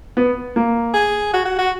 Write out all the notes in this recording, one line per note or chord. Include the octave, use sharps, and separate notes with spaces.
B3
A#3
G#4
F#4
F#4
F#4